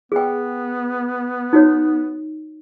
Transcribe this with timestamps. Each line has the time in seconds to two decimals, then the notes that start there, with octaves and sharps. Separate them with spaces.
0.12 B3 G#4 G5
1.53 D#4 F#4 C#5